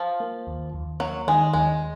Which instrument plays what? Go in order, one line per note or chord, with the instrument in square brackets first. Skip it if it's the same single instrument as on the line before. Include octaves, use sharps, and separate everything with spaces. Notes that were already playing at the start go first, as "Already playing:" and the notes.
Already playing: [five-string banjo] F3
[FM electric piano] A#3
D#2
D#2
[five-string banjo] F#3 [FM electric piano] A#3
[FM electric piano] D#3 [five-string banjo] G#3
[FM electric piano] D#2 [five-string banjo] G#3